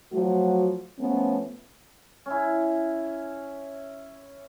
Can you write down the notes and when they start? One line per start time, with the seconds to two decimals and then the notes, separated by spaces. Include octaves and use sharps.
0.13 F3 F#3 A3 F#4
0.99 F3 A3 B3 C#4
2.26 C#4 E4